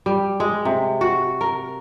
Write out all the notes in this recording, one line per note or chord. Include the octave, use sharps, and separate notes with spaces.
G3
G#3
C3
F#4
A#4